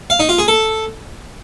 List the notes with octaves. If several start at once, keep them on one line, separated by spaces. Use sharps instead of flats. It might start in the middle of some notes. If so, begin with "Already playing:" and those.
F5
D#4
F4
G#4
A4